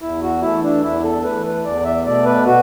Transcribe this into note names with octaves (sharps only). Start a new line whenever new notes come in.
E2 E4
F#4
E3 A3 E4
D4
E2 E4
A4
E3 A3 B4
E2 D5
E5
B2 A3 D5
B4
F#4